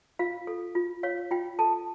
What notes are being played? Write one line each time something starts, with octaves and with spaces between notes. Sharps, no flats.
F4 F5
A4
F4
C#5 F5
F4 G5
A4 A5